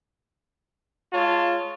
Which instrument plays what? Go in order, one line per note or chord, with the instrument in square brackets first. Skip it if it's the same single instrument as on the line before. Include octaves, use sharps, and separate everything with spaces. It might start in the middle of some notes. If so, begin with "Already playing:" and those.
[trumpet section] G#3 F4 C#5 A5